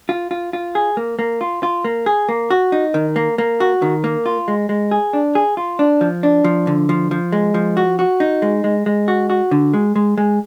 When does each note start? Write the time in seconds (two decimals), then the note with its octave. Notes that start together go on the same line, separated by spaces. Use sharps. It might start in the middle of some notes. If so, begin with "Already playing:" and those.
0.09 F4
0.31 F4
0.53 F4
0.75 G#4
0.97 A#3
1.19 A#3
1.41 F4
1.63 F4
1.84 A#3
2.06 G#4
2.29 A#3
2.51 F#4
2.72 D#4
2.94 D#3
3.16 A#3
3.38 A#3
3.60 F#4
3.82 D#3
4.04 A#3
4.26 F4
4.48 G#3
4.69 G#3
4.91 G#4
5.13 D4
5.35 G#4
5.57 F4
5.79 D4
6.01 F3
6.23 D4
6.44 F3
6.67 D3
6.89 F3
7.11 F3
7.33 G#3
7.54 F3
7.77 F#4
7.99 F#4
8.20 D#4
8.42 G#3
8.64 G#3
8.86 G#3
9.08 F#4
9.30 F#4
9.51 D3
9.73 G#3
9.96 G#3
10.18 G#3